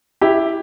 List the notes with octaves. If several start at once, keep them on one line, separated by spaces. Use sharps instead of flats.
E4 G4